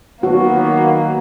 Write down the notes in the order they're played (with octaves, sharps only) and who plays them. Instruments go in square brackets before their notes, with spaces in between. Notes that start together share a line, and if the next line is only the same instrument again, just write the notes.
[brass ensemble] D#3 F#3 B3 [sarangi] A#3 [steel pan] F#4